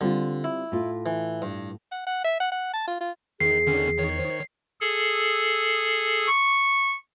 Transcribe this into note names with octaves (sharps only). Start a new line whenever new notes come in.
D3 G3 C4 F4
E4
A2 F4
E3
G2
F#5
F#5
E5
F#5
F#5
A5
F4
F4
E2 D#3 G#4 C7
D3 D#3 C#4
D#3 C#5
C5
G#4 A4
C#6